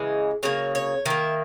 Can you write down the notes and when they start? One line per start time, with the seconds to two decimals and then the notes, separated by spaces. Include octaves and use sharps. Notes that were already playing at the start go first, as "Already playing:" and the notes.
Already playing: C#3 E3 G#3
0.43 C#3 F#3 A#3 C#5
0.75 C#5
1.06 D#3 A#3 E5